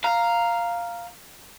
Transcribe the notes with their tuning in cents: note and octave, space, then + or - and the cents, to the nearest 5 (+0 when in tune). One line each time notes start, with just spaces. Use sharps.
F5 +0 A#5 +0